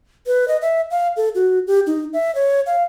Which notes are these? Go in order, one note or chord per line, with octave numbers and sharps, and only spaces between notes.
B4
D#5
E5
F5
A4
F#4
G4
D#4
E5
C#5
F5